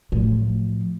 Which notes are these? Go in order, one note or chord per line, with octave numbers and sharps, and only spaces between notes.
A2 F3